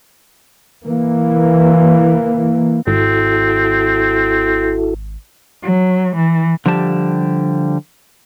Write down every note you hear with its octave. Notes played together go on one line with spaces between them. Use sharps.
E3 A#3
G#1 C4 E4 F#4 A4
F#3
E3
D3 F3 G3 G4 A5